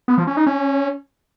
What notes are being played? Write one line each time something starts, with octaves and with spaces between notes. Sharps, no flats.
B3
F3
C#4
D#4
C#4